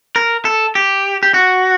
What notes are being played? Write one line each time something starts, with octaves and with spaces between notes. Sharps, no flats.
A#4
A4
G4
G4
F#4